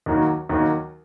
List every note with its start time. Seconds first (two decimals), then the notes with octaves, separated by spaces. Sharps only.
0.06 D#2 D#3 F#3
0.49 D#2 D#3 F#3